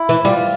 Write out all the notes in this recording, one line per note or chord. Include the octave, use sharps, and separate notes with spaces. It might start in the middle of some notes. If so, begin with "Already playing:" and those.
Already playing: E4
E3
G3 F4